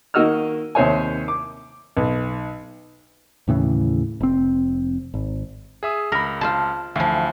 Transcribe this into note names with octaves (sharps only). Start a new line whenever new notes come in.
D#3 A#3 F#4 D#5 E6 F6
D#2 C3 C5 C#5 G#5
D6
B1
D#2 A2 C#3 E3
F1 C4
G#1
G#4 E5 D#6
C#2 A#4 B5
F4 C5 A5
D2 E3 F3 F5